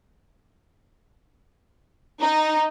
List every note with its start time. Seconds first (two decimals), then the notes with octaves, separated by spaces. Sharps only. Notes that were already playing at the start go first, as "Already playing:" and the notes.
2.20 D#4